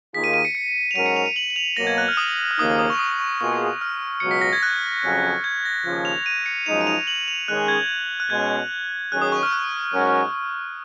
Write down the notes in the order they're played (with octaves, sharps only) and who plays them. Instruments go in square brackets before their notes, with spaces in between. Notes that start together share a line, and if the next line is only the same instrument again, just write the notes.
[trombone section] D#2 D#3 A#3 F4 G#4 [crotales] B6
[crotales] D#7
D#7
C#7
C#7
F7
[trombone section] G#2 F#3 C#4 F#4 A#4 [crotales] D#7
[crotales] C#7
F7
D#7
F#7
F#7
F7
[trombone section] B2 F#3 A#3 [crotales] A#6
[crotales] G#6
F#6
F6
D#6
F6
[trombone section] D#2 C#3 F3 A#3 D#4 [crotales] D#6
[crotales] D#6
C#6
D#6
C#6
[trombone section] B2 A#3 F4 G#4 [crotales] C#6
[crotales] F6
[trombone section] C#2 B2 F#3 [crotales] C#7
[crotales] B6
A#6
G#6
F#6
[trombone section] F2 C#3 F#3 C#4
[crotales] G#6
A#6
[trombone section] D#2 C#3 F3
[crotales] F7
D#7
C#7
[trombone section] F#2 F3 G#3 D#4 [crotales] F7
[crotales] D#7
F7
F#7
F7
[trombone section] D#3 G#3 C#4 G#4 [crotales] F#6
[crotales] G#6
F#6
[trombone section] B2 G#3 C#4 [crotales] G#6
[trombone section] D#3 F#3 C#4 G#4 [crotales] F#6
[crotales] D#6
C#6
F6
F#6
[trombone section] G#2 F#3 C#4 F#4 A#4